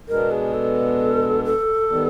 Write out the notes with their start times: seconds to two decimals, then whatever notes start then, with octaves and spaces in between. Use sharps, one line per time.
0.09 B2 G#3 B3 D4 A#4
0.31 G#4
0.54 A4
1.44 A4
1.89 D#3 G3 B3